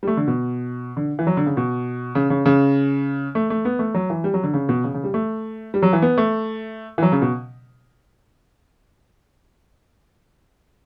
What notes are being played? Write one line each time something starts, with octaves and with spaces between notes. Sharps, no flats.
G3
A3
D3
B2
D3
E3
F#3
D3
C#3
B2
C#3
C#3
C#3
A3
A3
B3
A3
F#3
E3
G3
F#3
D3
C#3
B2
C#3
C#3
G3
A3
G3
F#3
E3
B3
A3
E3
F#3
C#3
B2